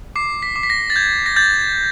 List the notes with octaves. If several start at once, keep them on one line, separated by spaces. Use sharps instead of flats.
D6 C7
B6
D6
B6
A#6
A6
G6 G#6
A#6
G6 A6